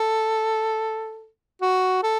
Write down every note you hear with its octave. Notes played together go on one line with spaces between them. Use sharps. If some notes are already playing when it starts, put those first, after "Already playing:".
Already playing: A4
F#4
A4